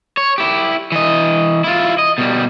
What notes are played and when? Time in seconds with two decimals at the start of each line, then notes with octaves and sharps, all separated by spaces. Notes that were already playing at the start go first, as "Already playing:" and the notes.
0.17 C#5
0.38 E4 G4
0.92 E3 D#5
1.64 E4 F4
1.99 D#5
2.18 B2 G3